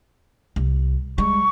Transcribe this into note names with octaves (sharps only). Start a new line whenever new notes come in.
C2
G3 G#3 C#6